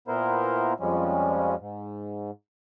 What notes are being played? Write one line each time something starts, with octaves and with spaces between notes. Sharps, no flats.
A#2 B3 E4 A#4 C5
F2 F3 G3 G#3 C#4
G#2